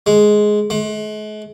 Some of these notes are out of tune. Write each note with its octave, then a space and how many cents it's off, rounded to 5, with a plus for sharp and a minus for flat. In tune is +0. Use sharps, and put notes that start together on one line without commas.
G#3 +10
G#3 +45